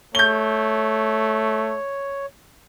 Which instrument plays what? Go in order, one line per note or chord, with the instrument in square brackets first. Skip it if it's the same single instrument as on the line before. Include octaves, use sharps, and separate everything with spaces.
[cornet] A3 [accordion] C#5 [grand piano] G6 G7